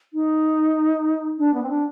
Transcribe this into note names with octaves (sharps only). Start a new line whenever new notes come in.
D#4
D4
B3
C4
D4